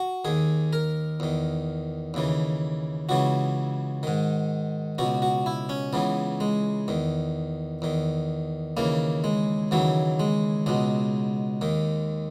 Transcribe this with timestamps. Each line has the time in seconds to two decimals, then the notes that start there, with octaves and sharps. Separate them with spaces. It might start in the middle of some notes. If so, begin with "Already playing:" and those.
Already playing: F#4
0.25 D#2 D#3 G#4
0.73 A#4
1.20 E2 D#3
2.14 D#2 C#3 E3
3.09 C#2 C#3 E3 F#4
4.03 G#2 D#3
4.98 C#2 B2 F#4
5.22 F#4
5.46 E4
5.69 C#4
5.93 C#2 C#3 E3 B3
6.40 G#3
6.88 E2 D#3
7.82 E2 D#3
8.77 D#2 C#3 E3 A#3
9.24 G#3
9.71 D#2 C#3 E3 F#3
10.20 G#3
10.66 C#2 B2 G#3
11.61 D#2 D#3